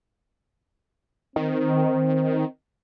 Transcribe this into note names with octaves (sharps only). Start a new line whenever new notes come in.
D#3 C4